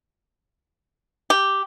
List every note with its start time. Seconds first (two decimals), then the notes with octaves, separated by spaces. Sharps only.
1.30 G4